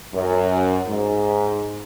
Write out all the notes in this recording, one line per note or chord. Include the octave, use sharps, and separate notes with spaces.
F#2
G#2